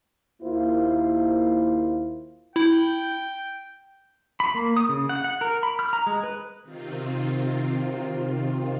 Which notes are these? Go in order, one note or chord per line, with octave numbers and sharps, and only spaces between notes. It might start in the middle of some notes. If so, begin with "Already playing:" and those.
D#2 A#3 E4 F4 C5
E4 G5
B5
A#3
D#6
C#3
F#5
F#5
A#4
B5
F6
A#5
G#3
B4
C3 D#3 C4 F4